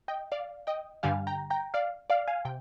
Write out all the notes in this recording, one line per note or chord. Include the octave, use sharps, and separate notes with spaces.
D#5 G5
D5 F5
D#5 G5
G2 D3 G3 F5 G#5
G5 A#5
G5 A#5
D5 F5
D5 F5
F5 G#5
C3 G5